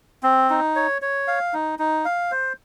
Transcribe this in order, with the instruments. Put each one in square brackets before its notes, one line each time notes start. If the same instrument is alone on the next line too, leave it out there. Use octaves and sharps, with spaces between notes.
[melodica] C4
D#4
C#5
C#5
F5
D#4
D#4
F5
C5